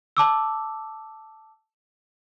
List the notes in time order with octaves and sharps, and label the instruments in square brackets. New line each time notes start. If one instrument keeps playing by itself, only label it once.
[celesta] A5 D6 E6